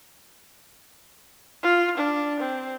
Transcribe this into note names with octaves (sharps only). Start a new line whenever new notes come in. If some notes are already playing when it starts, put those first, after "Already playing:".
F4
D4
C4